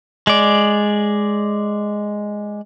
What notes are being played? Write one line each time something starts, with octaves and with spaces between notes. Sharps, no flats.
G#3 D5